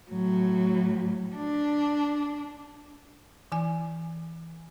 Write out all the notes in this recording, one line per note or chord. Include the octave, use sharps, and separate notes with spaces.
A2 F#3
D4
E3 G#5